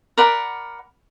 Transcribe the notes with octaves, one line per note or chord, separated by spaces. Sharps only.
A#4 D5 F#5 B5